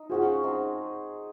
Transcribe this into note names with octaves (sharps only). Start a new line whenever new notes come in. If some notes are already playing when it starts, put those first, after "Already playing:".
Already playing: D#4
C#4 F4 F#4 G#4 C5
G#3 C4 D#4 G#4